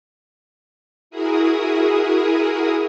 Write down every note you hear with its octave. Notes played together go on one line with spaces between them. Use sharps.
E4 F#4 G#4 A#4 D#6